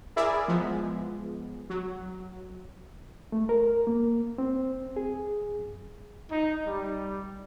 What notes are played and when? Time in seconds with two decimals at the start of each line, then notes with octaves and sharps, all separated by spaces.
0.16 E4 G#4 A#4 D5 E5
0.48 F3 G#3 B3
1.70 F#3
3.32 A3
3.49 A#4
3.87 A#3
4.38 C4
4.96 G#4
5.58 F#2
6.32 D#4
6.67 G3